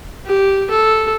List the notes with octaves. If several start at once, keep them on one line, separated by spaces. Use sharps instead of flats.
G4
A4